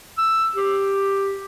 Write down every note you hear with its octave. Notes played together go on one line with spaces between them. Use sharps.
E6
G4